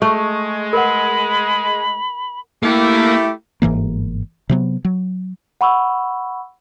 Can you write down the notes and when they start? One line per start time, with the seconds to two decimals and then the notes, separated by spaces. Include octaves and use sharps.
0.02 G#3 A3 C#6
0.73 A#4 B4 F#5 B5
2.63 A3 A#3 E4 G4
3.62 G1 G#2 E3 A#3
4.49 C3 F#3 B3
4.85 F#3
5.61 F#5 B5 C#6 E6